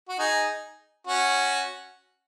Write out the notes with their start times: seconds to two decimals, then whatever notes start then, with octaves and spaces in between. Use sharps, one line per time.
0.09 F#4
0.19 D#4 G#4
1.07 C#4 F#4